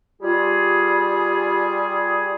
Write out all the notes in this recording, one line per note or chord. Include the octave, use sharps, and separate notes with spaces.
G3 F4 G#4